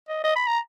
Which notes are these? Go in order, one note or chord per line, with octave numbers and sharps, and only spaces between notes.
D#5
D#5
B5
A#5